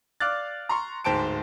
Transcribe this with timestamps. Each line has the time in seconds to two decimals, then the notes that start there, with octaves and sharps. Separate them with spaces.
0.20 D5 F5 D6 F6 F#6 A6
0.69 A#5 C6 C#6
1.04 D1 G#2 C5 G5 A5 D7